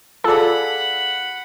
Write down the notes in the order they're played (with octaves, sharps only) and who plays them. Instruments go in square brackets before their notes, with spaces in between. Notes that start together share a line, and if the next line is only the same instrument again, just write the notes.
[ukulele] F4 G#4 D5 [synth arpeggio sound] A4 [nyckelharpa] F#5 B5